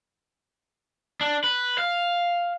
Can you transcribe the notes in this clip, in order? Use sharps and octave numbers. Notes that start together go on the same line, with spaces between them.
D4
B4
F5